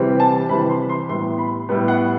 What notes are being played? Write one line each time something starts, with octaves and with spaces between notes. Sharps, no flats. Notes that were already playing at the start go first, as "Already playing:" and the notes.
Already playing: C3 E3 G3 C4
A5
C3 E3 G3 C4 B5
C6
C6
A2 G3 B3 C6
B5
A2 G3 B3
F#5